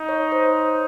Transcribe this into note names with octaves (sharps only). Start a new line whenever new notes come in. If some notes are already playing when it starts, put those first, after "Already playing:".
Already playing: D#4
C#5
C5